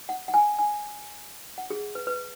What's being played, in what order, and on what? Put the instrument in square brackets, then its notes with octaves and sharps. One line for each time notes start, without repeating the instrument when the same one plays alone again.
[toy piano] F#5
F#5
G#5
G#5
F#5
G#4
B4
B4